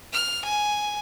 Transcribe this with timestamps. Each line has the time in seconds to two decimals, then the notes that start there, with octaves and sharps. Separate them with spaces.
0.13 F6
0.45 G#5